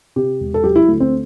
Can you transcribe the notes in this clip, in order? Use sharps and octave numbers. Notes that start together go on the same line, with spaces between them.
C3 G4
E1
A4
F#3 G4
E4
D2
C4